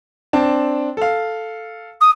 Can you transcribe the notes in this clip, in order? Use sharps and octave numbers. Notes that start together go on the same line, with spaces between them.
C4 D4 A5
A4 F5
D#6